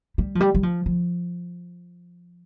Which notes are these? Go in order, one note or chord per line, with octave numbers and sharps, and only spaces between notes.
G3
F3
G3
G3
F3
F3